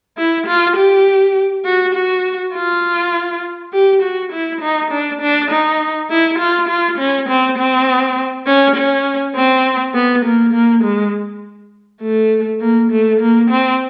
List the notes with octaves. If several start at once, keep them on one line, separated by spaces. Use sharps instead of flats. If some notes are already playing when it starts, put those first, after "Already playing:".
E4
F4
G4
F#4
F#4
F4
G4
F#4
E4
D#4
D4
D4
D#4
E4
F4
F4
C#4
C4
C4
C#4
C#4
C4
B3
A#3
A#3
G#3
A3
A#3
A3
A#3
C4